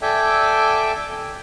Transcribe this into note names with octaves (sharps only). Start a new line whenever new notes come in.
A4 D5 E5 G5 G#5